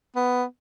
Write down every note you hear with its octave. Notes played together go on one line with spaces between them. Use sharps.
B3